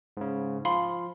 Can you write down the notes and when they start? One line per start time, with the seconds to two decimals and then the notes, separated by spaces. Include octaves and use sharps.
0.17 G#2 C#3
0.65 F3 F5 B5 C6